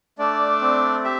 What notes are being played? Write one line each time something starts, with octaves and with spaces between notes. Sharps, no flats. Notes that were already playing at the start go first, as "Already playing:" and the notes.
A3 D4 D5
C4
G4 E5